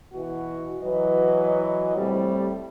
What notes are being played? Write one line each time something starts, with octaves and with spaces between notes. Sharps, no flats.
B2 E3 F#4
E3 F#3 B4 D#5
A2 C3 G3